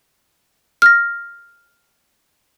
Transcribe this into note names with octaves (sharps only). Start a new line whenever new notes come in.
F6 A#6